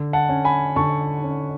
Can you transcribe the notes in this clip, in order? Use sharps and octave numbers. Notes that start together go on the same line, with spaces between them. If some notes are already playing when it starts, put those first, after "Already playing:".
Already playing: D3
F#5 A5
C#4
G#5 B5
D3 A5 C#6
C#4